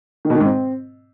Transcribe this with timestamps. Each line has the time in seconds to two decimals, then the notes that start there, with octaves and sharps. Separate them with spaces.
0.25 D#3
0.30 B2
0.35 D#3
0.40 G#2
0.45 C4